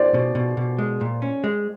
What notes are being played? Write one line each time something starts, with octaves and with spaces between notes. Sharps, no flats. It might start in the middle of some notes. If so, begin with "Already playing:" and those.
Already playing: C5 D5
B2
B2
B2
G#3
A#2
C#4
G#3